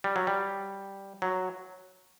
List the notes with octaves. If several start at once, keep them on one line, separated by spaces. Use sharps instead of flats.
G3
F#3
G3
F#3